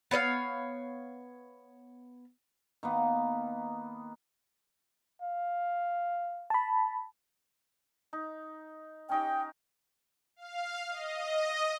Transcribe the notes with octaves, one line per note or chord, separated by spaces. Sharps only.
B3 C#5 D#5 F5
D#3 A#3 B3
F5
A5 B5
D#4
C#4 D#4 G4 G5
F5
D#5